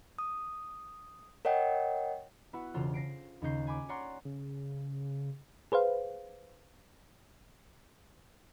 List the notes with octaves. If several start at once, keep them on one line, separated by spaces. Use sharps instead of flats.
D#6
A#4 C#5 D#5 F#5 G5
B3 E4 F#4 B4
E1 C#3 F4 A4 C5 F6
A#6 C7 D7
D#2 C#3 C#4 D#4 G6 C7
G#5 B5 D6
C#5 D5 F#5 A#5 C6 F6
C#3
G#4 B4 C5 F5